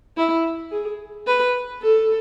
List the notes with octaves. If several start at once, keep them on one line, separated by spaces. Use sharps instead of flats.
E4
G#4
B4
A4